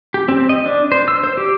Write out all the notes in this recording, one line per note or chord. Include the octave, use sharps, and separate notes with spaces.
G4
C4
D#5
D4
C5
E6
C5
G4